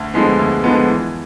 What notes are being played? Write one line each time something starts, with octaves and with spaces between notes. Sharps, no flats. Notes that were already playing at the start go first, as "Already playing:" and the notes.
Already playing: D2
D3 F3 G#3 B3
D2
D3 F3 G#3 B3
E3